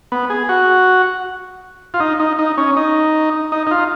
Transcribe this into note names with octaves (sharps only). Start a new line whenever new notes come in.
B3
G#4
F#4
F4
D#4
D#4
D#4
C#4
D#4
D#4
D#4
F4